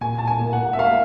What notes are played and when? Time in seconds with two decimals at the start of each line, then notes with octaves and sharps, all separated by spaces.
0.01 A#2 G#5
0.18 A5
0.27 G#5
0.40 A#3
0.53 F#5
0.73 E5
0.78 A#3 F5